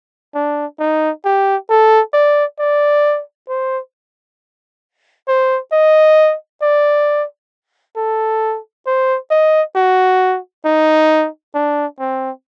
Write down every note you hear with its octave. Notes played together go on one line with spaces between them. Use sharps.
D4
D#4
G4
A4
D5
D5
C5
C5
D#5
D5
A4
C5
D#5
F#4
D#4
D4
C4